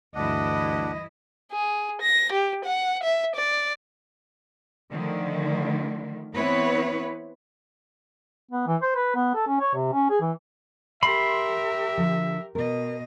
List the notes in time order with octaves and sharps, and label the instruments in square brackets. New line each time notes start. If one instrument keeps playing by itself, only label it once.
[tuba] D2 [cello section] G2 E3 E4 [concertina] D4 F#5 [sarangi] D#5
[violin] G#4
A#6
G4
F#5
E5
D5
[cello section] D3 D#3 F3 A3
E3 B3 C4 E4 B4 C#5
[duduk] B3
E3
C5
B4
B3
A4
C#4
C#5
C3
C#4
G#4
E3
[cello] G4 A#4 [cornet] E5 [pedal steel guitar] B5 C6
[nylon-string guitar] D3 F3
[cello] B2 D#5 [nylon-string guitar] A#4